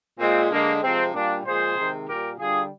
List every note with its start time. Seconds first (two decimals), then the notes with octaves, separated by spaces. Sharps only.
0.20 A#2 G#3 C4
0.51 D3 G#3 A#3
0.82 C3 F3 G#3 C4
1.14 A#2 G3 A#3 D4
1.44 A#2 F3 G#3 G#4 C5
1.76 C3 D#3 G#3
2.07 A#2 G3 G4 A#4
2.38 D3 G3 F4 G#4